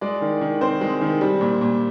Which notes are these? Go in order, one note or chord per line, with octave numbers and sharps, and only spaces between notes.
G#3 D5
D#3
D#3
C4 C5
G#3
D#3
G3
A#2
A#2